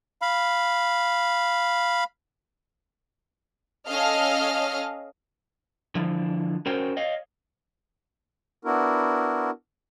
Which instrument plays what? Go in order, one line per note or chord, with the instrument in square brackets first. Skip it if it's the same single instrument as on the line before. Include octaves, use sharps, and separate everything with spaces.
[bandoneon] F5 B5
[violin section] C#4 A4 D#5 F5 F6
[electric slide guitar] D3 E3 F3
C#4 F#4 A#4 C5 G5
C#5 D#5 F5
[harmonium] B3 D4 E4 F#4 A#4